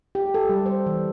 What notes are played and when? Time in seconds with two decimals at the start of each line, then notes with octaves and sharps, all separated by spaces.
0.15 G4
0.34 A4
0.49 G3
0.66 C5
0.87 E3